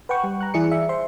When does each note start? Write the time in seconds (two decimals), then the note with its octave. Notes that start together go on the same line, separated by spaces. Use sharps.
0.09 B4 F#5 G5 C#6
0.24 G3
0.40 A#5 F#6
0.54 E3 E4 G#4 D5 C#7
0.71 E5
0.89 C5 E5 C6